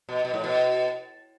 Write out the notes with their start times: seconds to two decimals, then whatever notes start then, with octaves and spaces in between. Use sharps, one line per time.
0.09 B2
0.25 B2
0.34 A2
0.44 B2